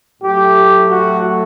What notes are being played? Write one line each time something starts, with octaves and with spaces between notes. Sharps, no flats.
A2 F#3 A3 G4
F#4